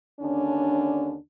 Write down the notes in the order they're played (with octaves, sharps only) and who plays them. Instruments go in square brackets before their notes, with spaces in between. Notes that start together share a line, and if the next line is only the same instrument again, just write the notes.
[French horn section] D#2 D3 C#4 D4